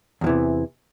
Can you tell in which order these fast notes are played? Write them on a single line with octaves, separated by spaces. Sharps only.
E2 F3 E3 C3